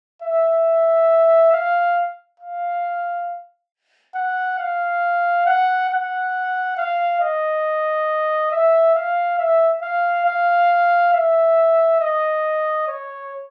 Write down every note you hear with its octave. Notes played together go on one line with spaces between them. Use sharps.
E5
F5
F5
F#5
F5
F#5
F#5
F5
D#5
E5
F5
E5
F5
F5
E5
D#5
C#5